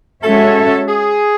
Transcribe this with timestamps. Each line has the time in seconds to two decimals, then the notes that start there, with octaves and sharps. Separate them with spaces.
0.23 G#3 C#4 F#4 A4 C#5 E5
0.89 G#4